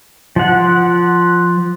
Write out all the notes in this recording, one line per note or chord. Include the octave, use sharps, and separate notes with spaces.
F3 F#5